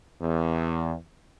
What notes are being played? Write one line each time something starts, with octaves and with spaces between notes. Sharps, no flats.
E2